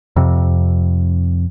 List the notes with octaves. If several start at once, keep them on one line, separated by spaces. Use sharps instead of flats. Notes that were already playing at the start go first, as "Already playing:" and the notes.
F2 C3